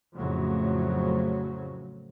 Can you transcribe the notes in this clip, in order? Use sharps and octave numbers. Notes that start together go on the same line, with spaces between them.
F2 A2 C#3 F#3